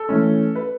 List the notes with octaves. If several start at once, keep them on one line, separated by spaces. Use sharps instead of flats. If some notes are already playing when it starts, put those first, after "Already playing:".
Already playing: A4
E3 A3 C#4
B4